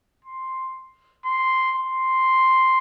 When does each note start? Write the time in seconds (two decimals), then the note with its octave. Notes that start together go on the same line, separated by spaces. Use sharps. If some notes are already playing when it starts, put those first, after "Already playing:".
0.25 C6
1.25 C6
1.76 C6